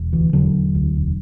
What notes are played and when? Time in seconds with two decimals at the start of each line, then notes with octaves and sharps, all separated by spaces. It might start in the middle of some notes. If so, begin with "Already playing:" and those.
Already playing: E1
0.13 D2 E3
0.33 E1 D3 F#3
0.54 E1
0.75 D2
0.95 E1